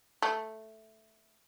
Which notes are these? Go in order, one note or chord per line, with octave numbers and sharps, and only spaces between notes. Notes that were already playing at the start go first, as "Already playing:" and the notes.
A3